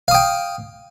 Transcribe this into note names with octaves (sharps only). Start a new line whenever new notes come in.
F5 G5 D#6